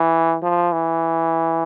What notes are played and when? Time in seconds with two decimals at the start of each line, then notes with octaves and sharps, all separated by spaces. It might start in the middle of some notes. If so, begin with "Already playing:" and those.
Already playing: E3
0.43 F3
0.72 E3